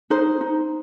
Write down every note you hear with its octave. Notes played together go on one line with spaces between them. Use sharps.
D#4 C5
D#4